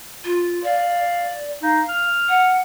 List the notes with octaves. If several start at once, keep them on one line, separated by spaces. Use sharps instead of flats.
F4
D5 F5
D#4 F5
F6
F#5